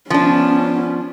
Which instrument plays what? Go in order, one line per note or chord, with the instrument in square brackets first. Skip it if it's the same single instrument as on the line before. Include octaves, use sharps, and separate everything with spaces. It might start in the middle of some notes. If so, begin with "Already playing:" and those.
[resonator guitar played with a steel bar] F3 D4 [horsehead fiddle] B3 C#4